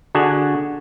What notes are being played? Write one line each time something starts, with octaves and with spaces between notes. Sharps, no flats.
D3 D4 F#4 G#4